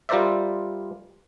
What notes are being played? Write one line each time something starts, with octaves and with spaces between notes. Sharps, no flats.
G3 F4 A#4 C5 D5 E5